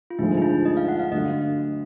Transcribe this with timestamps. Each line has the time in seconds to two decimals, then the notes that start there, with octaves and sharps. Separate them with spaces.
0.10 F4
0.19 D2 D3 F3 G#3 D#4
0.37 D#4
0.42 F4
0.65 D#5
0.77 F5
0.88 F#5
0.99 F5
1.11 D2 D3 F#3 D#5